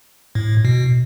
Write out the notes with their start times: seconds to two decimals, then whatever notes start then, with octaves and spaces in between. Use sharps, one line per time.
0.35 A2
0.65 B2